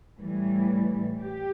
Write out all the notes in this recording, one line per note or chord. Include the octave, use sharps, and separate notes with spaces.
A2 E3 G3
G4